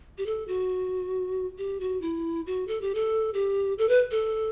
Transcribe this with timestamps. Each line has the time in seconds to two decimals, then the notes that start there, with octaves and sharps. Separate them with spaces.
0.18 G4
0.26 A4
0.48 F#4
1.58 G4
1.80 F#4
2.02 E4
2.47 F#4
2.68 A4
2.81 G4
2.95 A4
3.34 G4
3.78 A4
3.89 B4
4.11 A4